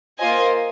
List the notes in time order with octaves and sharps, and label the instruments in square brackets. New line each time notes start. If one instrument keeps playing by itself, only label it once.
[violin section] A#3 F4 C5 D#5 G#5